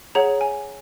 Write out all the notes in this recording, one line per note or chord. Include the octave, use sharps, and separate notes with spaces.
G#4 C#5 F#5 A#5
G#5